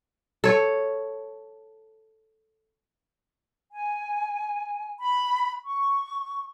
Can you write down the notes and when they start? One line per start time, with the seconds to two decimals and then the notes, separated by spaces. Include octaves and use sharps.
0.44 A4 C#5
3.70 G#5
4.99 B5
5.65 C#6